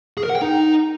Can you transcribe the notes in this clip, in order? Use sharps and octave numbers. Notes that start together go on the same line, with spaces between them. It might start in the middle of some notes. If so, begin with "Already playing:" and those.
G#4
A#4
F#5
G5
D#4